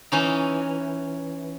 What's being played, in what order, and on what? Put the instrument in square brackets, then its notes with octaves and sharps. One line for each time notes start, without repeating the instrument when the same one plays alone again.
[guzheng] E3 C#4 D#4